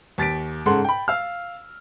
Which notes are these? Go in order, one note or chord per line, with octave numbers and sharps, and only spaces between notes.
D#2 A6 B6 D7
G#2 C#3 A4 F#5 C6
G5 B5
F5 E6 F6